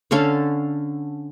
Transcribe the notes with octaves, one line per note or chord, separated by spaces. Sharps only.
D3 C#4 A4 F5